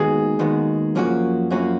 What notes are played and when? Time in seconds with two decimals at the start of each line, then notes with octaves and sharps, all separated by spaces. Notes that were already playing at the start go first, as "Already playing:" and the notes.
Already playing: D#2 D#3 G#3 B3 F#4 G#4
0.39 D#2 D#3 G#3 B3 F#4
0.95 F#2 F3 A#3 C#4 F#4
1.50 F#2 F3 A#3 C#4 F#4